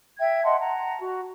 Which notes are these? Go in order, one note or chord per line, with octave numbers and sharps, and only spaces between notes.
E5 G5 G#6
D#5 F#5 A5 C6
F#5 A5 A#5
F#4